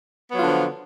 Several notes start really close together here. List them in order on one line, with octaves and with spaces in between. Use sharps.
B3 F#3 F4 D3 F3